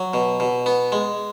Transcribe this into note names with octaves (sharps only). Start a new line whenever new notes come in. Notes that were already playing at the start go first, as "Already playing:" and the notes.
Already playing: F#3
B2
B2
B3
G#3